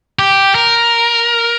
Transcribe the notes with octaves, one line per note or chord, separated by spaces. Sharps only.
G4
A#4